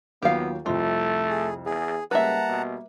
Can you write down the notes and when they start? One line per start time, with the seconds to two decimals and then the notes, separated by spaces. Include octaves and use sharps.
0.22 D#2 F#3 B3 F4 G4 F5
0.66 C2 F2 A3 F4
1.29 G#4
1.66 E2 G#4
2.11 C#2 G3 A#3 B4 E5 F#5 A5 A#5
2.49 B2